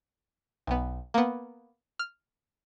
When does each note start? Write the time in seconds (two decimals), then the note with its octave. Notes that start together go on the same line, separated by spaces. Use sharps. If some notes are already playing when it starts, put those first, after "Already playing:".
0.67 B1 B3
1.14 A#3 B3
1.99 F6